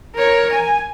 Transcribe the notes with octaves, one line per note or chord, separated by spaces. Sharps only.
A#4 C#5
G#5